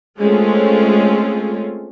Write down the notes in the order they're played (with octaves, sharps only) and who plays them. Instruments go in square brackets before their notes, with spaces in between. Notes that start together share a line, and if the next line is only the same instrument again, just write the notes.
[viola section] G#3 A3 C4 C#4 F4 G#4